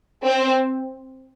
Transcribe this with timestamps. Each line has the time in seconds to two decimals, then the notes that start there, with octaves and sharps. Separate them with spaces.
0.24 C4